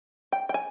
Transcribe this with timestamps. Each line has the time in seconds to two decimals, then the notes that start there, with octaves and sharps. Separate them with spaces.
0.32 G5
0.49 G5
0.54 G#5